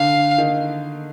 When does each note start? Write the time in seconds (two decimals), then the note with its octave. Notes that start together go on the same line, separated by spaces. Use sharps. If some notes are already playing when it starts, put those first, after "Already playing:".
Already playing: D3 D4 F5
0.38 D#3 D#4